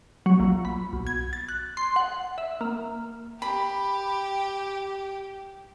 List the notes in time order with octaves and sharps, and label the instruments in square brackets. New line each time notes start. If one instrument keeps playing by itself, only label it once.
[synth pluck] F#3
A#1
B5
B1
G#6
A6
F#6
C6
F#5
E5
A#3
[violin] G4 [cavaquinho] B5